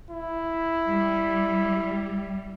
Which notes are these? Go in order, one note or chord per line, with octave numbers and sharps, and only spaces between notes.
E4
G3